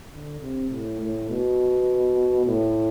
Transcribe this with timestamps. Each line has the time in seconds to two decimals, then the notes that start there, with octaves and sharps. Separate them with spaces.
0.12 D3
0.41 C3
0.70 A2
1.00 A2
1.30 B2
2.46 A2